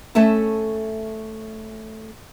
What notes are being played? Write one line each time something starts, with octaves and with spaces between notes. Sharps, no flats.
A3 C#4 A4 E5 A5